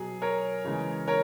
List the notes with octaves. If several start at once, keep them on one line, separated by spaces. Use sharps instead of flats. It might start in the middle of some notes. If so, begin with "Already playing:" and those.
Already playing: B2 F#3 G#4
A#4 C#5
C#3 E3 G#3
A#4 C#5